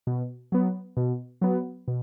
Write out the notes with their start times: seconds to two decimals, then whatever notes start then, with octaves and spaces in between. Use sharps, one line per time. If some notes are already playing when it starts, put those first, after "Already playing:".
0.07 B2
0.52 F#3 B3
0.97 B2
1.41 F#3 B3
1.88 B2